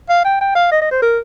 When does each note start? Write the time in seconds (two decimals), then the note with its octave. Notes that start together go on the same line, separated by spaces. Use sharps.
0.09 F5
0.25 G5
0.41 G5
0.55 F5
0.72 D#5
0.82 D#5
0.91 C5
1.02 A#4